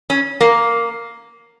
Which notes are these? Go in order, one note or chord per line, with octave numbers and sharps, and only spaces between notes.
C#4
A#3